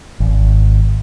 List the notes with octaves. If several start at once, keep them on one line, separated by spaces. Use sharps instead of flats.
G#1